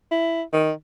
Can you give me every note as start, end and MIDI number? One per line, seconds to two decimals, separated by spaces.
0.11 0.42 64
0.53 0.72 51